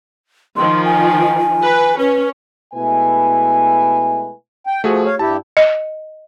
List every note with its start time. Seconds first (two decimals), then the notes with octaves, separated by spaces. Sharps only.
0.56 D#3 F3 C6
0.85 G#5
1.63 B4
1.99 C#4 B4
2.74 B2 G#3 A3 E4 B4 G#5
4.67 G5
4.84 F3 A3 F#4 G#4
5.05 C#5 F5
5.19 G2 E4 G4 A5
5.57 D#5